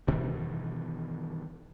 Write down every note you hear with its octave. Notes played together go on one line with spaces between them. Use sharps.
G2 B2 D#3 E3